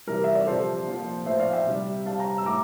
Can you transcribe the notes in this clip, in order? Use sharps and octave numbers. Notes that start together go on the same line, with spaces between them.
C3 E3 G3 A#4
E5
D5
C3 F3 A4 C5
A#2 F3
A2 F3 C5 E5
D5 F5
E5 G5
C3 G3
C3 G3 F5 A5
G5 A#5
E6
A2 F3 A#5 D6